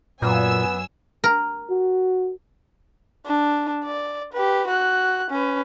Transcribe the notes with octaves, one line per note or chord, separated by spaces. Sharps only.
F#2 A#2 B3 G#5 E6
A#4
F#4
D4
D5
G4 B4
F#4 F#6
C#4 B4